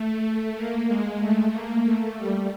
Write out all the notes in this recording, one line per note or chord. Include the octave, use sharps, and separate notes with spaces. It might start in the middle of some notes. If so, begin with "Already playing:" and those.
Already playing: A3
A#3
G#3
A3
A#3
A3
G3